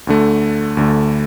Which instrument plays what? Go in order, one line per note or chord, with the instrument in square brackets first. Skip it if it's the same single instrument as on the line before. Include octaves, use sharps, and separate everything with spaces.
[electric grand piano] D2 D3 A3
D2 D3 A3